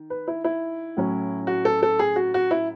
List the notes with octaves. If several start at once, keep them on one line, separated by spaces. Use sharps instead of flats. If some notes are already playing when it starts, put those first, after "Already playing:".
Already playing: D#3
B4
E4
E4
A2 F#3 C#4
F#4
A4
A4
G#4
F#4
F#4
E4